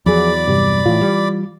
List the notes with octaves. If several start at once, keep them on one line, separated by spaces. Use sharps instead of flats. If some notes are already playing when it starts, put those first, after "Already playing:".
E2 F3 F#3 G#4 D5 B5 D6
G2 C3 G3
A2 E3 F4
G3